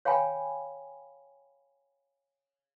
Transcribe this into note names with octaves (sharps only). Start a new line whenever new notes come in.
C#5 F5 G5 G#5 B5